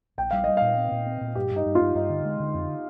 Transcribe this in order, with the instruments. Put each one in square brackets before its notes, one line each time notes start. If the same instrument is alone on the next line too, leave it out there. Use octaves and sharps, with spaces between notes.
[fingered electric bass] A#1 [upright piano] G5
[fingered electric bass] G3 [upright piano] F5
[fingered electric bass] G3 [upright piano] D#5
[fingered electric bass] A#2 [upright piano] F5
[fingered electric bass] C4
A#2
C4
A#2
[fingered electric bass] G2 [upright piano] G4
[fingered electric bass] G2
[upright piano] D#4
[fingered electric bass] G2
[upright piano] F4
[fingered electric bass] G2
[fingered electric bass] G2 [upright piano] D#4
[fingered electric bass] D3
G#3
D3
F2